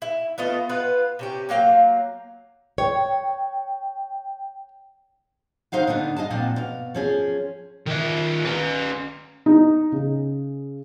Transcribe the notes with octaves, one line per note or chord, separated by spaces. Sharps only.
E4
A3 B3 F4 D#5
B3 F4 B4
C3 C#4 G4
F#3 A#3 F5 G5
C#5 G5
D#3 D#4 C5 F5 F#5
D3 B3 D4 D#4
D#5 F5 G#5 A5
A#2 F3 C4 F4 F#5 G#5
B2 F5
F3 C#4 G#4
D#3 E5
C#4 B4
D#4
C#3